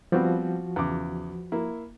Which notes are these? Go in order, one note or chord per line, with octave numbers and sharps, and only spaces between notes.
F3 G3 B3 C4 F#4
E2 C#3 D6
A#3 E4